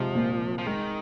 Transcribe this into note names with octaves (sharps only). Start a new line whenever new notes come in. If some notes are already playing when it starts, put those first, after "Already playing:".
Already playing: C3 F3 G#3 C4
A#2 A#3
F3
D#3 G#3